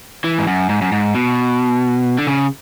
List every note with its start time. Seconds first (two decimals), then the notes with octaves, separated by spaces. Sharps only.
0.24 E3
0.38 G#2
0.47 F#2
0.69 G#2
0.82 F#2
0.92 G#2
1.15 B2
2.18 D3
2.27 C#3